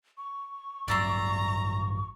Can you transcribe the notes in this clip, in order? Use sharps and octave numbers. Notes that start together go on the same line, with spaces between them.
C#6
A1 G2 F#3 D5 E5 A#5 C6